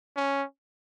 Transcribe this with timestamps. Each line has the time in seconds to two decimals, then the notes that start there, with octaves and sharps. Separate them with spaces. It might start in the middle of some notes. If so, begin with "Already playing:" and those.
0.16 C#4